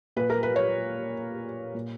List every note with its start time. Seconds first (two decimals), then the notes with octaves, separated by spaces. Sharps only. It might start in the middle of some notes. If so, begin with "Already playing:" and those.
0.16 A#2 B4
0.30 A#4
0.43 B4
0.56 C#5
1.74 A#2